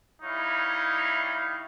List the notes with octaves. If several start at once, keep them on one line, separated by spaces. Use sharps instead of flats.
G3 D#4 E4 C#5 F5